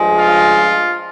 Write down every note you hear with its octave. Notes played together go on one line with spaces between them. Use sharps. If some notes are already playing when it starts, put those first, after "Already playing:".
Already playing: G2 F3 G#3
F4